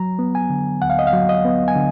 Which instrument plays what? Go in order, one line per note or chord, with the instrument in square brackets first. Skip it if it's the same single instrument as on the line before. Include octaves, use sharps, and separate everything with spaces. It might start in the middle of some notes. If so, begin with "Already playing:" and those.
Already playing: [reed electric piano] F#3 A#5
B3
G#5
D3
D2 F#5
F5
D#5
F5
F#3
D#5
B3
G#5
D3